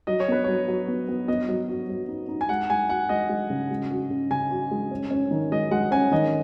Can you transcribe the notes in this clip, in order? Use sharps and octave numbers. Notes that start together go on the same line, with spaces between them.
F#3 D#5
C#5
B3 B4
F#3 C#5
F#3
B3
B3
B3 D#5
F#3
F#4
F#3
D#4
D#4
G#5
G#3 F#5
G#3 G#5
F#4 F#5
G#3 D#5
G#3
C#3
G#3
F#4
C#3
C#3 G#5
F#4
G#3
C#4
C#4
D#3
G#3 D#5
G#3 F#5
C#4 G#5
D#3 D#5